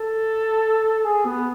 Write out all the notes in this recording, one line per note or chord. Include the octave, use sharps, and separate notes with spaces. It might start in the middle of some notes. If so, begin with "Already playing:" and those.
Already playing: A4
G#4
B3